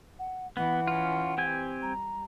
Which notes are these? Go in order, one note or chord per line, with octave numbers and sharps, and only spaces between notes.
F#5
E3 B3 F#5
C#4 F4
C4 G4 G#5
G3 A#5